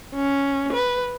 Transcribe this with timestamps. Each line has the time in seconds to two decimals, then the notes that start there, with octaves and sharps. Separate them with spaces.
0.15 C#4
0.73 B4